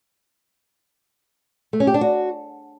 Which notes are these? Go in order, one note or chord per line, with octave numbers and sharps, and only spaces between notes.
A3
C#4
G4
D4
F#4